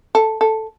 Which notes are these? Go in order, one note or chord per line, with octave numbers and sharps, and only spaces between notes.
A4
A4